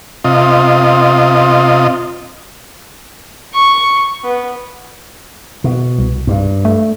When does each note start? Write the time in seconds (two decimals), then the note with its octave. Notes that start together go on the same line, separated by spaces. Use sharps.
0.24 C3 F4 D#5
3.55 C#6
4.24 B3
5.64 B2
5.99 C2
6.27 G2
6.65 A3